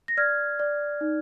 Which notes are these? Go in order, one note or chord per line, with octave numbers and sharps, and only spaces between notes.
A#6
D5 F6 G#6
D5
D#4